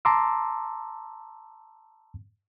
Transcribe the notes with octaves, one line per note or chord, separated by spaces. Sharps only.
A5 A#5 C6 D6 E6